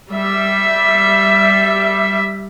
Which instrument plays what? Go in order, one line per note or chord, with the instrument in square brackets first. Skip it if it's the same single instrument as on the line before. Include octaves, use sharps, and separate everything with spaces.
[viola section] G3 E5